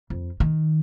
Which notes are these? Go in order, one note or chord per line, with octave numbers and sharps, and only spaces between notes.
F2
D#3